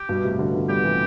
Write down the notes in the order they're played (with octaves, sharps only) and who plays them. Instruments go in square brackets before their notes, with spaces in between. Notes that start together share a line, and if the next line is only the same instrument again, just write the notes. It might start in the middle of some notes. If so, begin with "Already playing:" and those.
Already playing: [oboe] G4
[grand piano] G2 B2
A2 C3
B2 D3
D3 F3
[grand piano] G3 B3 [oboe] G4
[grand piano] C3 E3